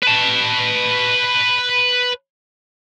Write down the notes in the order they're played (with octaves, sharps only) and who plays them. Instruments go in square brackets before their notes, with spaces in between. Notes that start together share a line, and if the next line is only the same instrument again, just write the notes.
[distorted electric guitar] B4 A5